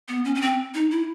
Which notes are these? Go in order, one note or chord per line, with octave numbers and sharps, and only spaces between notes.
B3
C#4
C#4
C4
D#4
E4